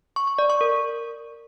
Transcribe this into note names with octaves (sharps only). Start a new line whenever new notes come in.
C#6
C#6
D5
C#6
A#4